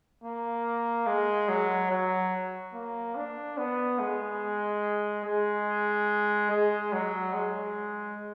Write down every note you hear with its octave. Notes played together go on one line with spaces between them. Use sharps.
A#3
G#3
F#3
F#3
A#3
D4
B3
G#3
G#3
G#3
F#3
G#3